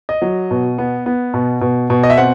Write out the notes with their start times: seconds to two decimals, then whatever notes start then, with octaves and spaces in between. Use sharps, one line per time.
0.09 D#5
0.22 F#3
0.51 B2
0.78 B3
1.06 B3
1.34 B2
1.61 B2
1.90 B2
2.03 D#5
2.10 E5
2.17 C4 F#5